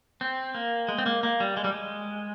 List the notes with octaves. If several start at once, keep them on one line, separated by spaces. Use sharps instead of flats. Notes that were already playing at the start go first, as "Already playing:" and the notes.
C4
A#3
G#3
C4
A#3
A#3
G3
G#3
G3
G#3